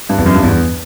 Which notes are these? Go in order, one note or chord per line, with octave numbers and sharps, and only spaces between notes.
G2
E2
F#2
G2
E2